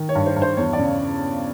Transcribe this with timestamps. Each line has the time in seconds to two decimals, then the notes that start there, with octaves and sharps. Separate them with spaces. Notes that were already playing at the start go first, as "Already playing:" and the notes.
Already playing: D#3
0.09 C#5
0.15 G2
0.26 C5
0.36 G2
0.42 C5
0.57 E2 C#5
0.73 D5
0.79 C#3